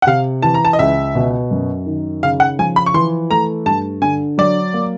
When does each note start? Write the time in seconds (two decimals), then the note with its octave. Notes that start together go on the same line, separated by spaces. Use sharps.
0.02 F#5
0.07 C3 F5
0.43 E3 A5
0.54 A#5
0.65 A5
0.73 D#5
0.79 C#2 E5
1.15 B2
1.51 F#2
1.86 D#3
2.23 C#3 F5
2.40 F#5
2.59 F3 G#5
2.76 B5
2.86 C#6
2.94 E3 C6
3.31 A3 A#5
3.66 G2 A5
4.02 D3 G#5
4.38 F#3 D5
4.73 A#3